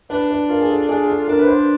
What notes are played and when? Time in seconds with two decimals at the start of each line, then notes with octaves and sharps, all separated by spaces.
0.10 D4 B4
0.30 B4
0.50 F4 A#4
0.60 G#4
0.70 A4
0.89 D4 G#4
1.08 A4
1.28 D4 A#4
1.39 B4
1.47 C5